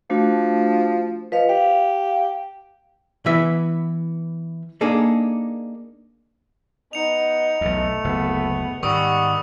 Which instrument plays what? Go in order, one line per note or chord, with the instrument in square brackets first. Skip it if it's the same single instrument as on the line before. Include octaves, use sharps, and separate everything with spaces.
[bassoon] F3 [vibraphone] A3 D4 F#4
[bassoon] F3 [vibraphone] B4 D#5 F5
[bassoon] G4 [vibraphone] F5
[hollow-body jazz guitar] E3 B3 E5
A#3 D4 D#4 G#4 A4
[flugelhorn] B3 [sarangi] D#4 [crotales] C#7 F7
[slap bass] B1 E2 [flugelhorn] A3
[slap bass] F#1 D2 [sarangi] B3
[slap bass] G#2 D#3 [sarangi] G3 [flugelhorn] F#5 [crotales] C#6 D#6 E6